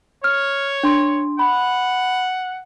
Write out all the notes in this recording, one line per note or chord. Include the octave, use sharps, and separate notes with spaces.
C#5 F6
D4 C6
F#5 B5